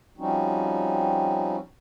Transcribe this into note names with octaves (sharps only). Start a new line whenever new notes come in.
F3 G3 C4 C#4 D#4 F#4